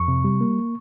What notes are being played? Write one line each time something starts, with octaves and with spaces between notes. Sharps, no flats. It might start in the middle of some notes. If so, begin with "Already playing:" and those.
Already playing: F2 C#6
C3
G3
A#3